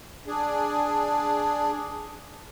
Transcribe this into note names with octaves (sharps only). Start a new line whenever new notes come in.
D4 G#4